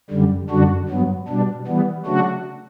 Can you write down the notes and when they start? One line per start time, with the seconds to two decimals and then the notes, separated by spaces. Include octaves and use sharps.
0.10 F#2 D3 G3
0.50 F#2 D3 G3 D4 F#4
0.89 G2 F#3 B3
1.28 B2 G3 D4
1.67 E3 G3 B3
2.06 C#3 F#3 A3 D4 F#4